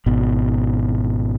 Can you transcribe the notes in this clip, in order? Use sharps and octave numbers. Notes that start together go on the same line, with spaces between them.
G#1 B2